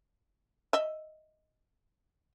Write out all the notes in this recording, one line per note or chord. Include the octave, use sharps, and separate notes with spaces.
D#5 E5